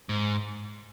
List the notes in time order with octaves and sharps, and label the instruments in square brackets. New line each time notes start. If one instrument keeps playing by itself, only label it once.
[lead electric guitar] G#2